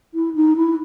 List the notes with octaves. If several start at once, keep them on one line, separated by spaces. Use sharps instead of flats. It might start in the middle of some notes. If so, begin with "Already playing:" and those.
E4
D#4
E4